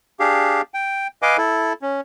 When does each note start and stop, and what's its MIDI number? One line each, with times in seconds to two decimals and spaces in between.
0.20 0.61 62
0.20 0.61 67
0.20 0.61 68
0.20 0.61 77
0.74 1.07 79
1.22 1.37 71
1.22 1.37 75
1.22 1.37 77
1.22 1.37 80
1.22 1.37 86
1.38 1.73 64
1.38 1.73 69
1.82 2.01 61